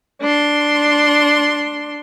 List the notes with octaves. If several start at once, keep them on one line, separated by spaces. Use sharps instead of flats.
D4 C6